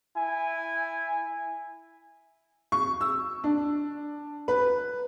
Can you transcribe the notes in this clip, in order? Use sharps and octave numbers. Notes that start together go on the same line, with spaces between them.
E4 G#5
C#6
E6
D4
B4